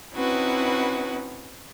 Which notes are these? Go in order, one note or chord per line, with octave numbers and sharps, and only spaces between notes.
C4 C#4 D#4 E4 F#4 B4